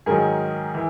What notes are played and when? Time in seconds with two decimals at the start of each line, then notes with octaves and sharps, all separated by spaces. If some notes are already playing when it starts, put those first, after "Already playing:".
0.06 G#2 D#3 F#3 G#4 A#4
0.75 E3